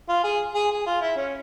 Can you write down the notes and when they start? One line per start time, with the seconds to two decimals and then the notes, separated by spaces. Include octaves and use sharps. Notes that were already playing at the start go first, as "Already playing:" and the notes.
0.09 F4
0.24 G#4
0.54 G#4
0.71 G#4
0.86 F4
1.01 E4
1.17 C#4